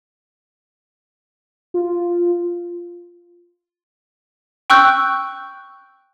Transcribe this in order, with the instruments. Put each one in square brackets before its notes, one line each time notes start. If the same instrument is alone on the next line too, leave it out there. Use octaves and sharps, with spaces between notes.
[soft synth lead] F4
[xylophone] G5 C#6 E6 F#6 G6